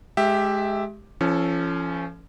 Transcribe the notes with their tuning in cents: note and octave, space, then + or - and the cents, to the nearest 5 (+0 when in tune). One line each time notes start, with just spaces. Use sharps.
G#3 +25 G4 +0 E5 +0
F3 -35 C#4 +0 A4 +0